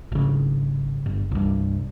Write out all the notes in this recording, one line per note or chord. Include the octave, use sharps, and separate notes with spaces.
G#1 C#3
G1
C2 G2